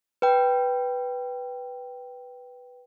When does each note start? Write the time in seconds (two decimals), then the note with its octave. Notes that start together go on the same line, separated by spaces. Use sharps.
0.22 B4 G5